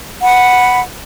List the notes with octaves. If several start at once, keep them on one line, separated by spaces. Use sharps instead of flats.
F#5 B5